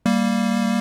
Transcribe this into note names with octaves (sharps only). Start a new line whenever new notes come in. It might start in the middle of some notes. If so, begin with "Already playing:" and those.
G3 A#3